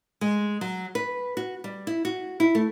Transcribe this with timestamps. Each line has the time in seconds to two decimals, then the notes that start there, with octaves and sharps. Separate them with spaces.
0.21 G#3
0.61 F#3
0.95 B4
1.37 F#4
1.64 G3
1.87 E4
2.05 F#4
2.40 E4
2.55 A3